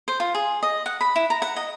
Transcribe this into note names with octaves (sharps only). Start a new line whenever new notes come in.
C5
F4
G#4
D#5
F#5
B5
E4
A#5
F#5
D#5